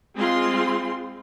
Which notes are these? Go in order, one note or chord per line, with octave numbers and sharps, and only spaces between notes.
G#3 C4 F4 C6